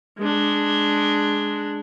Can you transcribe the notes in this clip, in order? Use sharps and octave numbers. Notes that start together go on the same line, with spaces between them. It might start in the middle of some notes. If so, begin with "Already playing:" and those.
G#3 D4